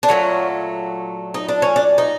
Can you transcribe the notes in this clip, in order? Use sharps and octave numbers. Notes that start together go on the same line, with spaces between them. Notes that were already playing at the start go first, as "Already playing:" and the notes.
D4
A#2 F#3 A3 C#4
D#4
D4
C#4
D4
D#4